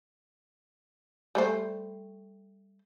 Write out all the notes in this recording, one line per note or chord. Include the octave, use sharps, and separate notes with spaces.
G3 A3 C5